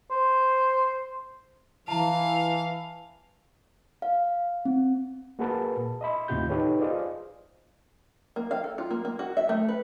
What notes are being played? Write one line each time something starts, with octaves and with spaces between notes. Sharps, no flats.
C5
E3 F5 A5 A#5
F5
C4
A#3 F#4 G#4 A#4 B4 A5
A#2
D#5 E5 B5 C6
D#2 A2 C3 F4 G4 G6
D#4 G4 A4 B4 C#5
F4 G#4 C5 D5 D#5 F5
A#3
F5
A4
F4
A#3
A#3
F#4
E5
A3
B4